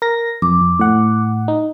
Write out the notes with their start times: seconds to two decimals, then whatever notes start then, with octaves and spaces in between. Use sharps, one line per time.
0.02 A#4 A#6
0.42 F2 D6
0.61 F2
0.79 A2 F#5
1.48 D#4